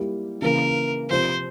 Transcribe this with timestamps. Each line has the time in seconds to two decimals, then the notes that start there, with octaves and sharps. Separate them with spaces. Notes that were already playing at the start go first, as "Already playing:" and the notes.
Already playing: G3 A#3 E4 G4
0.42 C#3 E3 A#3 A#4
1.10 C3 F3 C4 C5